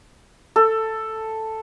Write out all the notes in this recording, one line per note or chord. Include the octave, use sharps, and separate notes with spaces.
A4